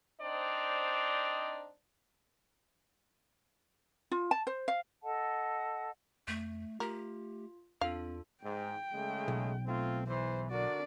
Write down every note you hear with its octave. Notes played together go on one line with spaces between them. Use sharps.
C4 D4 D#4 C5 D5 D#5
F4
A5
C5
F5
A4 D#5 F#5 A5
F2 A3
A3 F4 G4 A#4
E2 C4 D4 F4 A4 F5
G#2 G5
C#3 G#3 A3
B1
A3 C4 F4
E2 E3 C5
D3 D4 F#4 A#4 D5